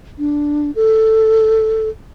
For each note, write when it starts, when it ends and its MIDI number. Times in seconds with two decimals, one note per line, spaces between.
0.18 0.71 62
0.75 1.89 69